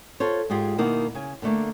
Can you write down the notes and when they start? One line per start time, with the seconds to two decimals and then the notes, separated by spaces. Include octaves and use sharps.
0.20 F4 A4 C5 C#5
0.50 G#2 G#3 F4 G4 G#4
0.78 B2 D#3 A#3 D#4 E4
1.15 C#3 G#5
1.42 A2 D3 A3 A#3